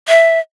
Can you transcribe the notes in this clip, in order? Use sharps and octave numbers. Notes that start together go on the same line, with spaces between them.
E5